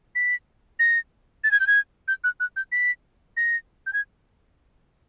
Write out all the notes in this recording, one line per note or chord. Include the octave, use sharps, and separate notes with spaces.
B6
A#6
A6
G#6
G6
G#6
G6
F#6
F#6
G6
B6
A#6
G6
G#6